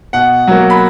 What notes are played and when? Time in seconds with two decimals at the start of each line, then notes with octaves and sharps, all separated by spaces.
0.13 B2 F#5
0.47 F#3 A#3
0.70 B5